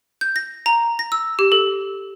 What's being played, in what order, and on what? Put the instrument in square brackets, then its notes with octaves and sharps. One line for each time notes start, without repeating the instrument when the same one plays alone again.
[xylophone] G6
A#6
A#5
A#6
E6
G4
A4